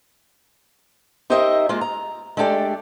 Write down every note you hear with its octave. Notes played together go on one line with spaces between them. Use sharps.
D#4 G4 A#4 C5 D#5 E5
G#3 A#3 F4
A#5
G#3 A3 D4 G4 A4 D5